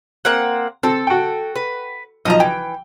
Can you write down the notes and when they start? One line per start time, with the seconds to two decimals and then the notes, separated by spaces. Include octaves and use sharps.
0.25 A#3 C4 F#5
0.83 C4 A4
1.07 F#4 G5
1.56 B4
2.25 B1 B2 F3 D#5 F5 A#5
2.40 E3 G5